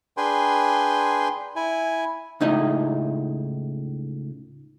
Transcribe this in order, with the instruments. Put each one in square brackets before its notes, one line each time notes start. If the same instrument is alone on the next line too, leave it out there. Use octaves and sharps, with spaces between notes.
[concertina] D4 G#4 B4 G5 G#5 C6
E4 G#5
[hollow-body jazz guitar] C#2 A2 D#4 E4 D#5